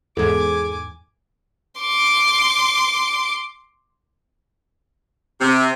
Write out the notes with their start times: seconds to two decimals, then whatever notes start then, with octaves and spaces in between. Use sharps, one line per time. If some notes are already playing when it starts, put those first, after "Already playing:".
0.17 E2 G#2 G#4 A4 G#5 D6 G#6
1.80 C6 D6
5.41 C3